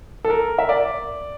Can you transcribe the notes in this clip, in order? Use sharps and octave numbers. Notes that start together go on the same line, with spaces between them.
A4
A#4
E5
D5